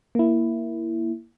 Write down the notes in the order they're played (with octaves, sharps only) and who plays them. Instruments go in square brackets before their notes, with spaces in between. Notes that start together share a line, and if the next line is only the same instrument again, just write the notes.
[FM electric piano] A#3 E4